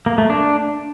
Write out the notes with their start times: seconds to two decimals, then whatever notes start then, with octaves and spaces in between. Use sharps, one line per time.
0.06 A#3
0.18 A3
0.30 D4